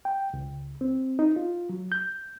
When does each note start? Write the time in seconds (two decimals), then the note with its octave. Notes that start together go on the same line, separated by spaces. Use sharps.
0.05 G5
0.34 C#2
0.81 C4
1.19 D#4
1.36 F4
1.69 F#3
1.92 G6